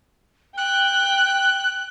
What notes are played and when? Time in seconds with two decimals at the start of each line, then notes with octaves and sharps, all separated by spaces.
0.58 G5 F#6